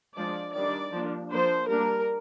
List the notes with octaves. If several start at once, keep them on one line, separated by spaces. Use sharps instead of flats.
F3 G#3 D4 D5
D#3 G3 D4 D5
F3 A#3 D4
F3 A#3 D4 C5
G3 A#3 D4 A#4